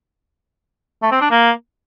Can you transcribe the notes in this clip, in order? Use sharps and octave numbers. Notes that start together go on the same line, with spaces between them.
A3
C4
D4
A#3